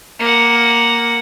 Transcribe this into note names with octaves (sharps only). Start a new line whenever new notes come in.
A#3 F#5